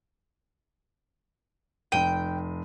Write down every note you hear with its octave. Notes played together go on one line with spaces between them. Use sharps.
F1 G5 D#7